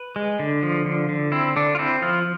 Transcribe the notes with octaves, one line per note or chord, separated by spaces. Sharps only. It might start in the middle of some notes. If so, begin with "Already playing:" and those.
Already playing: B4
G#3
D3
F3
D3
D3
C4 E4
D3 D4
F4
C4 E4
F3 F4